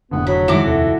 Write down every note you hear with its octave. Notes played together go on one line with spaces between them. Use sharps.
F1 A2 D3 B3
F#3 B5
F#2 D#3 G#3 E4 F#4 D6
D#1 F2 C3 A3